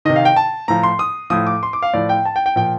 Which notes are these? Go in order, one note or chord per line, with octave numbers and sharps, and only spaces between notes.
C3 D#3 D#5
F5
G5
A5
A2 F3 A#5
C6
D#6
A2 F3 D#6
D6
C6
D6
F5
A2 F3 D5
G5
A5
G5
G5
A#2 F3 G5